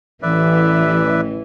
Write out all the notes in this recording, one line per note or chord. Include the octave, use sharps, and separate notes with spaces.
A1 E3 B4 D5 E5